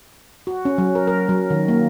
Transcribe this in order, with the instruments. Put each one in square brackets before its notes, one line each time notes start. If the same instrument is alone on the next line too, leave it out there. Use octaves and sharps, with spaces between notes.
[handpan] F#4
C#4
F#3
A#4
A#4
F#3
D#3
A#3